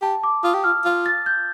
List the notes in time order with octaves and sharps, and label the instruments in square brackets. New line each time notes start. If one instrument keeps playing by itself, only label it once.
[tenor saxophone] G4 [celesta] A5
[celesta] D6
[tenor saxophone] F4 [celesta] D#6
[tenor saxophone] G4
[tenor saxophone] F4 [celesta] F6
[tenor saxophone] F4
[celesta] A6
G6